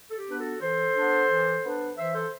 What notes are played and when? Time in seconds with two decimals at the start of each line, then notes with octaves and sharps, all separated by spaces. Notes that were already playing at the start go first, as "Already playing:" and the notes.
0.10 A4
0.16 G4
0.27 B3 D4 B4
0.38 F#4 A4
0.61 E3 A4 C5
0.95 B3 D4
1.29 E3
1.63 B3 D4
1.97 E3 C5 E5
2.14 A4 C5